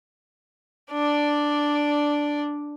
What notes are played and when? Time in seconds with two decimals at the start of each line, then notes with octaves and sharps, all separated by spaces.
0.92 D4 D5